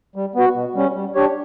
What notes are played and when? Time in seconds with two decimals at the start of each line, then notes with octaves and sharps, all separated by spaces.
0.16 G3
0.35 B3 F#4
0.55 B2
0.75 G3 C#4
0.95 G3
1.15 D4 G4 C#5